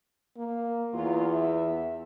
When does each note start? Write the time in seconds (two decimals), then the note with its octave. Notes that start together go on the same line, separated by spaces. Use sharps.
0.37 A#3
0.93 E2 F#3 F4
1.31 E5